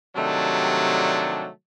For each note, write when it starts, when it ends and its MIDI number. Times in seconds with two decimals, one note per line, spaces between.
0.16 1.48 48
0.16 1.48 51
0.16 1.48 54
0.16 1.48 55
0.16 1.48 57
0.16 1.48 62